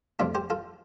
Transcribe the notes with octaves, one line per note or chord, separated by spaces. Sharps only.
F2 C3 A3 D4 F4 A4
G4 C5
F4 A4